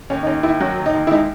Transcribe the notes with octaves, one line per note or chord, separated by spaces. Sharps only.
D#2 C#4
D#4
D#2 C#4
D#2 E4
F#3 F#4
D#2
D#4
D#2
E4
G#3 D#4